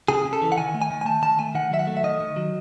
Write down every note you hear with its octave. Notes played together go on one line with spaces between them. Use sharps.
C#3 G#4
C#3
A4
E3
F#5
D#3 G#5
A3
G#5
D#3
G#5
A3 A5
D#3 A5
A3 G#5
D#3 F#5
F#3 E5
F#5
A3
E5
D#3 D#5
D#3
F#3